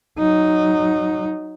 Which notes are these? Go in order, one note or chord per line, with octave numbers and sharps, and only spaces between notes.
F#3 D#4